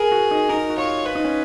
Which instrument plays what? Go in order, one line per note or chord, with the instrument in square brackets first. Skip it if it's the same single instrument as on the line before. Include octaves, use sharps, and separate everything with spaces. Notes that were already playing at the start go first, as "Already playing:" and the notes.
Already playing: [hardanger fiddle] G#4 [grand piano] A#4
[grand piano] F#4
D#4
[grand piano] D#4 [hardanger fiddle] A#4
[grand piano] F#4
[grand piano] F4 [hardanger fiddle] C#5
[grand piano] F4 [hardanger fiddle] B4
[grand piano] D#4
C#4